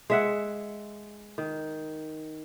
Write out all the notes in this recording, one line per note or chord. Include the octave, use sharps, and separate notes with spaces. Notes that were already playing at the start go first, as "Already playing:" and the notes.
G#3 E5 F#5
D#3